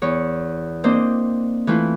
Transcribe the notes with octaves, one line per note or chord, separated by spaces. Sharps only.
E2 C#5
A#3 C4 D4 C5 D#5
E3 A3 E4 F4